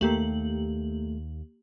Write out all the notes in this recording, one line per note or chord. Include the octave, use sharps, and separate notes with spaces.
D#2 A3 A#3 G4 F#7